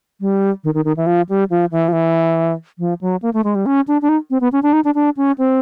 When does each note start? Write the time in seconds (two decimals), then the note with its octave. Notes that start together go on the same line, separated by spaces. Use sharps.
0.21 G3
0.64 D#3
0.74 D#3
0.85 D#3
0.97 E3
1.07 F3
1.29 G3
1.50 F3
1.72 E3
1.88 F3
1.93 E3
2.79 F3
3.01 F#3
3.22 A#3
3.34 A3
3.44 G#3
3.55 G3
3.66 C#4
3.88 D4
4.02 D4
4.09 D#4
4.30 C4
4.41 B3
4.52 C#4
4.63 D4
4.73 D#4
4.84 D4
4.95 D4
5.17 C#4
5.38 C4